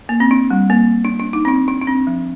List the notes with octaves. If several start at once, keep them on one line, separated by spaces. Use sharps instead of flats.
A#3
C4
D4
G3
A#3
D4
D4
D#4
C4
D4
D4
D4
C4
F3